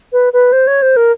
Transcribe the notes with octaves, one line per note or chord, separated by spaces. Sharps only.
B4
B4
C5
C#5
C5
A#4